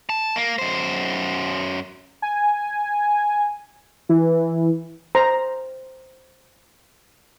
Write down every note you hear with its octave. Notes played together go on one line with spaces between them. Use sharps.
A5
A#3
F#2 C5
G#5
E3
C5 A#5